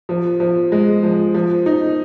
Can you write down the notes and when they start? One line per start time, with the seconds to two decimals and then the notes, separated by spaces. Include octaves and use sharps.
0.09 F3
0.40 F3
0.72 G#3
1.03 F3
1.34 F3
1.66 D#4